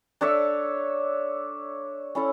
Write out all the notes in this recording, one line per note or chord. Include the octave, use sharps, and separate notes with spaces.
D4 A4 C#5 E5
C#4 E4 A4